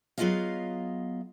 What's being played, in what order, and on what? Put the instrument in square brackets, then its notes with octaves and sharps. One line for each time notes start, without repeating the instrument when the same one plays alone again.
[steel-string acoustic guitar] F#3 B3 F4 G#4 D#5 F5